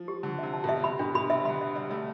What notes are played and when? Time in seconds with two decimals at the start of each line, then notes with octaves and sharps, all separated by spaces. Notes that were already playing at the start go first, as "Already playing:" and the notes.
Already playing: F3
0.08 G4
0.23 D3 A5
0.38 C3 E5
0.54 A5
0.64 B2
0.69 E5
0.84 C3 B5
0.99 B2 D4
1.15 B2 B5
1.30 C3 E5
1.45 D3 B5
1.61 E5
1.75 G3 E5
1.91 A3 E5